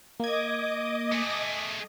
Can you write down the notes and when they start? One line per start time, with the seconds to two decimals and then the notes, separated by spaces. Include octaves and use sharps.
0.20 A#3 D#5 D6 D#6 G#6
1.12 A3 G#4